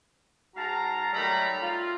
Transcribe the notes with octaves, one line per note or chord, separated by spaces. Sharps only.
G#2 F#4 F5 A5 A#5
D#3 F#3 G3 A3 A#5 B5
F4